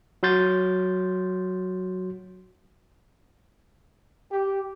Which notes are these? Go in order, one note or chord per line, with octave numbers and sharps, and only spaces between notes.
F#3 F#4 C6 G6 A6
G4